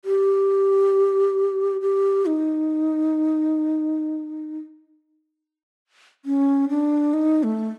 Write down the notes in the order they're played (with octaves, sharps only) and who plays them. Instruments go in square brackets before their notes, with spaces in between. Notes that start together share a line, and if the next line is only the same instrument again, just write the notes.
[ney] G4
G4
D#4
C#4
D4
D#4
A3